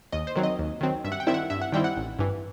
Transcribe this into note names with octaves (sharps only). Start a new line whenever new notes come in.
D#2 D#5
C5
D#3 F#3 C4
D#5
D#2
D#3 F#3 C4
G2 E5
F#5
G5
D#3 G3 C4 E4 E5
F#5
G2 E5
F#5
D#3 G3 C4 E4 G5
F#5
A1
G2 E3